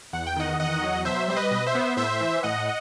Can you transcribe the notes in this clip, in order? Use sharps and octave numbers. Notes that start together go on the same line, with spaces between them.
E2 F#5
G5
D#3 D#5 F#5
E2 D#5 F#5
F#3
B2 C5 E5
G3 C5
B4 D#5
B2
C5 E5
B3
A2 C5 E5
E3
A2 D#5 F#5